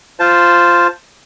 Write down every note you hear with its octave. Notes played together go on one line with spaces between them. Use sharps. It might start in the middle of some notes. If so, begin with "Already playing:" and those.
F4 C5 A5